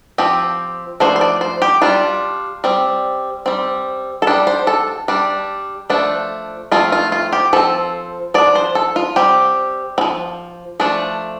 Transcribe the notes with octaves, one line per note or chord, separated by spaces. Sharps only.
F3 C4 G4
F3 A3 D4 C5
C5
D5
C5
G4
G3 D4 F4
G3 C4
G3 C4
A4
G3 D4 G4
C5
A4
G3 D4
F3 A3 D4
F3 A3 C4 F4
F4
F4
G4
F3 C4 A4
F3 D4 D5
C5
A4
F4
G3 C4 G4
C4
F3
F3 A3 D4